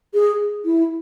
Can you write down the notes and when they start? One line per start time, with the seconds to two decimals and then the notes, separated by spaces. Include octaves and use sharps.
0.14 G#4
0.65 E4